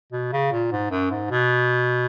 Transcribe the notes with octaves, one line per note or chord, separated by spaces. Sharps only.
B2
C#3
A#2
G#2
F#2
G#2
B2